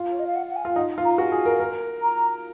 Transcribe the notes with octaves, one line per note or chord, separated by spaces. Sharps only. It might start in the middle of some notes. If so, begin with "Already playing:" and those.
Already playing: F4
C#5
D#5
F5
F#5
F#5
G#5
F4
D#4 F#5
F4
A#5
F#4 G#5
G#4
A#4
A#4
A#5